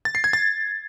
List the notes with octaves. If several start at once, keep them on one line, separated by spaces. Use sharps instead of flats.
A6
C7
G#6
A6